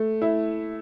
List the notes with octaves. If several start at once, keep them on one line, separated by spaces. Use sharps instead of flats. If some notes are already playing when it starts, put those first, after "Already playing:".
Already playing: A3
E4